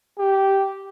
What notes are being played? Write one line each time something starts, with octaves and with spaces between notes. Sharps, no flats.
G4